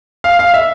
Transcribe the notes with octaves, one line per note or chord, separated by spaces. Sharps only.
F5
F5
E5